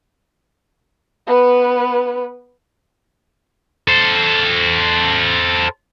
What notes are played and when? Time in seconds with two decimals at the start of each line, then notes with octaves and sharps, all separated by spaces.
1.27 B3 B4
3.88 A4 C5